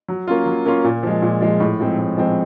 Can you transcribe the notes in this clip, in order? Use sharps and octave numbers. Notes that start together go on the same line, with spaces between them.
F#3
A#3 C#4 F4
F#3
A#3 C#4 F4
A#2
F3 G#3
A#2
F3 G#3
A2
F3 G#3 C4
A2
F3 G#3 C4